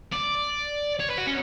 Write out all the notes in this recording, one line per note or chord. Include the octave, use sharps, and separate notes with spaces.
D5
C#5
B4
F#4
C#4